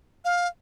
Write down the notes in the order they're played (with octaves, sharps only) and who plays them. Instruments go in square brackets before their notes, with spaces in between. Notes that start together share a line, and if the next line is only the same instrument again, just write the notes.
[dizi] F5